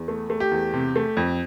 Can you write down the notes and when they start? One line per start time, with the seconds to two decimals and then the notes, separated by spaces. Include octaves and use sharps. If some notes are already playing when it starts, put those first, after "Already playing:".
Already playing: E2
0.08 A3
0.30 A3
0.40 G4
0.51 E2
0.74 C3
0.96 A3
1.17 F2